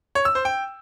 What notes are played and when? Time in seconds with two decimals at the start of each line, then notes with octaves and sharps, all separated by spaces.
0.15 C#5
0.25 E6
0.35 C5
0.45 G5